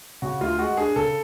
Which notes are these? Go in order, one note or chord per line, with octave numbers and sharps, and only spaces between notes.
C#3 F#4
D2 F4
G#3 F#4
D4 G#4
C#3 A4